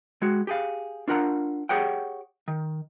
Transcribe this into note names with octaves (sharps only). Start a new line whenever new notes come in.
G#3 F#4
G4 G#4 F5
D4 F4 A#4 F#5 A#5
G4 G#4 C#5 F#5 G5
D#3